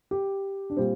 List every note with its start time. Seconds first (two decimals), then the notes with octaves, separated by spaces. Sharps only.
0.11 G4
0.70 D4
0.77 A#2 G3 C4